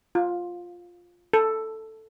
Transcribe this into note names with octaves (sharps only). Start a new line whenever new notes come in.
F4
A4